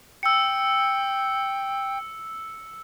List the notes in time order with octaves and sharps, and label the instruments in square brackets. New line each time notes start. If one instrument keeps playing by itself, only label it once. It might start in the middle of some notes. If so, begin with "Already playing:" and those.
[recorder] G5 [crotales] E6 C#7